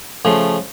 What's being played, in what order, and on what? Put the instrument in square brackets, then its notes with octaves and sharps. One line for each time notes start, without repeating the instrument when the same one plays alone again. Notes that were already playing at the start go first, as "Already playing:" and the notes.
[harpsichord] C#3 F3 A3